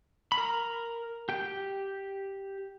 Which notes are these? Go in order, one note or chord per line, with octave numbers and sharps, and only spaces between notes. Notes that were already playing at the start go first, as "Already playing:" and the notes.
B5
A#4 A#5
G4 G5